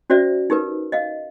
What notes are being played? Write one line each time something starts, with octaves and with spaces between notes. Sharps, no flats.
C#4 F#4 C5 D5 E5
D#4 G4 A#4 B4
D#5 F5